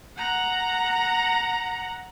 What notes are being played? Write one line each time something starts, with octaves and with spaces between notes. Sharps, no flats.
F#5 A#5